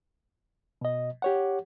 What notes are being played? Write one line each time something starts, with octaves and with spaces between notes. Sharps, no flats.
B2 D#5
G4 C#5 F#5